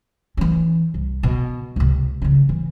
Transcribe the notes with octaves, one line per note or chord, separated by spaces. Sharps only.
E3 C#4
C2
B2
C#2 C3
C#3 D#4
E3